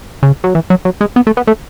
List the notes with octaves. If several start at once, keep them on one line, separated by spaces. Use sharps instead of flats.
C#3
F#3
E3
F#3
F#3
G#3
B3
A3
B3
A3